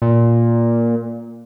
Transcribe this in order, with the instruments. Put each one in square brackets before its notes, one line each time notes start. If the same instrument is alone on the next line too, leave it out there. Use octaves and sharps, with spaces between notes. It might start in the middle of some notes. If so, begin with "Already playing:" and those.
[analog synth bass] A#2